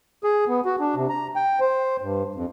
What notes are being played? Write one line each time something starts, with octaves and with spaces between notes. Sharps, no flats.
G#4
B3
F#4
D4
C3
A#5
G5
C5
G2
F2